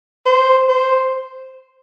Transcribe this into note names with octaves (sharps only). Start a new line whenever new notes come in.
C5
C5